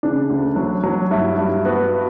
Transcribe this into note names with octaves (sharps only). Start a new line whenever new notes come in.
C#3 D4
D2
F#3
F#3
G2 E4
G2
B3 F#4